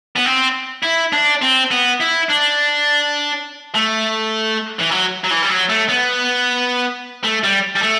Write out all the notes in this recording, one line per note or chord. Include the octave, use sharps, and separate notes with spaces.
B3
C4
E4
D4
C4
B3
E4
D4
A3
E3
F#3
F#3
E3
G3
F#3
A3
B3
A3
G3
G3
A3